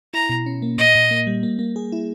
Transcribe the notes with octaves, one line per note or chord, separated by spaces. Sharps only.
E4 A#5
B2
C#4
A#3
A#2 D#5
A#2
A#3
G3
A#3
A#3
G#4
E4